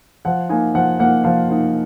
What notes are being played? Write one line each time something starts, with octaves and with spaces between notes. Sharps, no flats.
F3 F#5
A#3 D#4 G#5
F3 F#5
A#3 D#4 F#5
F3 F5
A#3 D#4